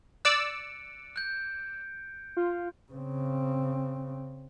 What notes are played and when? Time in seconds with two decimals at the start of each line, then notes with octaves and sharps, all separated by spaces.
0.25 D5 E6 F#6 C#7 D7
1.16 F#6 G6
2.37 F4
2.92 C#3 C4